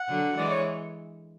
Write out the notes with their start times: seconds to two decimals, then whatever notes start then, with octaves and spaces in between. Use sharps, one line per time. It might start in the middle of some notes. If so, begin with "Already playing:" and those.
Already playing: F#5
0.08 D3 F#3
0.36 E3 G#3 D5
0.50 C#5